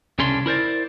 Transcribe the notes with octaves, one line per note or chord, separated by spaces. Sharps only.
C2 C#3 C#4 D4 C6
E4 A#4 C5 D5